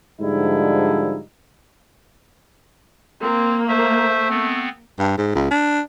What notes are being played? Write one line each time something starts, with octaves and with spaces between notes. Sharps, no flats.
G#2 D3 F3 G3 D#4 E4
A#3 C4
A3 C5 E5
B3 C4
G2
G#2
C#2
D4